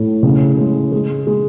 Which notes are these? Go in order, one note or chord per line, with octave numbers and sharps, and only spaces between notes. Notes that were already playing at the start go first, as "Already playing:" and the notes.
Already playing: A2
C#3
G#3
G#3
G#3